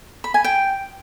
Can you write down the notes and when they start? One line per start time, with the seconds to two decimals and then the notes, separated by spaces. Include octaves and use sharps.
0.24 B5
0.34 G#5
0.44 G5